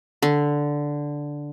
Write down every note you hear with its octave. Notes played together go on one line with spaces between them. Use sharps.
D3